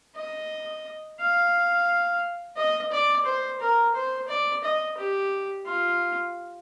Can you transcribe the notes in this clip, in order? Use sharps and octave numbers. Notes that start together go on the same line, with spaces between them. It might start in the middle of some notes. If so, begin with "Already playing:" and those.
D#5
F5
D#5
D5
C5
A#4
C5
D5
D#5
G4
F4